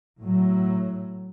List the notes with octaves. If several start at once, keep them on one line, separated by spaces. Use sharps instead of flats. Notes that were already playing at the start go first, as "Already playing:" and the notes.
A2 F#3